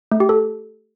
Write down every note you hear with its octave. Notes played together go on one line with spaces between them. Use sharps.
A3
G4
A4